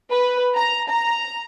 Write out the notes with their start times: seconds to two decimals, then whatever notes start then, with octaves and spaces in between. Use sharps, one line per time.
0.10 B4
0.56 A#5
0.88 A#5